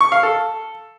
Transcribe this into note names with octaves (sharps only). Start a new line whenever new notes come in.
C#6
F5
A4